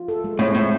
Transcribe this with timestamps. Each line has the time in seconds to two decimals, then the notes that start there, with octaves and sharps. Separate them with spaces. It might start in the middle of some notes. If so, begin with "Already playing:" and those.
Already playing: F4
0.08 A4
0.24 G#3
0.39 A2 C4
0.55 A2 E4